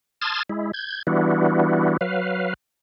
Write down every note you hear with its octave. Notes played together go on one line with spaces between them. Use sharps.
A5 C6 D#6 F6 G#6 A6
G#3 E4
G6 G#6
E3 G3 B3 D4 E4 F#4
F#3 B4 F5